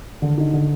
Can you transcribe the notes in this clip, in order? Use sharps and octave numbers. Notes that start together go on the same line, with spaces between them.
D3
D#4
D3